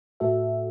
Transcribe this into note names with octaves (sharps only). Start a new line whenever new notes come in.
A2 A3 F#4 A4 E5